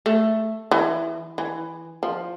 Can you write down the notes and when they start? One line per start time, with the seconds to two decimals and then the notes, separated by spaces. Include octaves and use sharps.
0.06 A3
0.71 E3
1.38 E3
2.03 F3